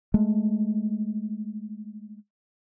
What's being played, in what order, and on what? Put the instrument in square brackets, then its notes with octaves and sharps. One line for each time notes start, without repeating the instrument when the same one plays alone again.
[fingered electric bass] G#3 A3